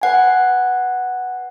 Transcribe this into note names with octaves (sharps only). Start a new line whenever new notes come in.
B4 F#5 G#5